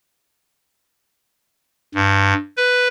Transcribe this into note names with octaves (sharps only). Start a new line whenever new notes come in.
G2
B4